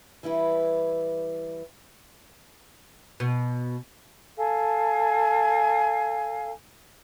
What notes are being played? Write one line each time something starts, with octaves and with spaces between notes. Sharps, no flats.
E3 G3 E4 B4
B2
A4 F5 G#5